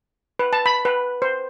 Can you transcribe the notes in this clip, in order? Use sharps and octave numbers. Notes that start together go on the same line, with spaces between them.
B4
A5
B5
B4
C5